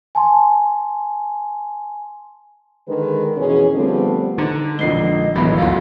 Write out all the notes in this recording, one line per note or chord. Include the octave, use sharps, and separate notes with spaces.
G#5 A5 C6
D3 D#3 G#3 G#4 B4
F2 B2 E3 C#4 F#4 G#4
D3 F3 G3 A3 B3 C4
D3 D#4
A#1 G#2 D#5 C7 G7
D1 D#3 E3 F#3 G3 B3 B5
C#2 F#2 F4 F#4 A4 F5